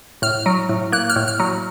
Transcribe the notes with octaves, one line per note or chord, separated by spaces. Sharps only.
A2 F6
F#3
A2
A#3 F#6
F6
A2
F6
F#3